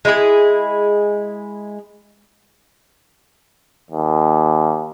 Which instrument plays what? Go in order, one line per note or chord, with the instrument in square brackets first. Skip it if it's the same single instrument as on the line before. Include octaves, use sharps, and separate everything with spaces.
[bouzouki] G#3 E4 F4 G#4
[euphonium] D#2